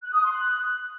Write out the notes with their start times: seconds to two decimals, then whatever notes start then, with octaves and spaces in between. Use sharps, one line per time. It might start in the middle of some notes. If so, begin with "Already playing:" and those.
0.02 F#6
0.12 D#6
0.22 C6
0.32 F#6